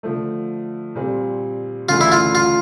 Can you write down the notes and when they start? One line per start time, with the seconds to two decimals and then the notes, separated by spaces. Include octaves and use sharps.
0.03 D3 F3 A3
0.95 A#2 G3 C4
1.89 D2 C#3 E3 A3 D4 F4
2.01 E4
2.12 F4
2.35 F4